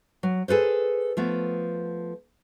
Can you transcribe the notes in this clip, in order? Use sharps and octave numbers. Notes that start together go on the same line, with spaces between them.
F#3
G#4 A4 B4 C5
F3 A3 B3